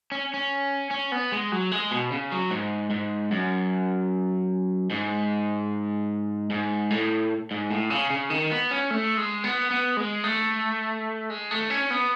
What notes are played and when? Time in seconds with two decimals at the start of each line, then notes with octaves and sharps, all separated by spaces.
0.12 C#4
0.34 C#4
0.91 C#4
1.12 B3
1.32 G#3
1.52 F#3
1.72 G#3
1.91 B2
2.12 C#3
2.32 F#3
2.51 G#2
2.91 G#2
3.32 F#2
4.90 G#2
6.51 G#2
6.90 A2
7.51 G#2
7.71 A2
7.90 C#3
8.10 C#3
8.30 D#3
8.51 B3
8.71 C#4
8.91 A3
9.17 G#3
9.44 B3
9.71 B3
9.97 G#3
10.24 A3
11.30 G#3
11.51 A3
11.70 C#4
11.90 B3